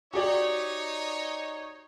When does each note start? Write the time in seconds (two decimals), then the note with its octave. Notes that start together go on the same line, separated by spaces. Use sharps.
0.14 D#4 F#4 G4 C#5 D5